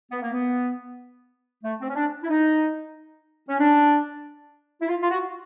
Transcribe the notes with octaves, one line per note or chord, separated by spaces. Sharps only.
B3
A#3
B3
A3
C4
C#4
D4
E4
D#4
C#4
D4
E4
F4
F4
F#4